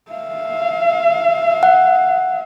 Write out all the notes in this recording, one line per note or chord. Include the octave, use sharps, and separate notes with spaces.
E5 F5
F#5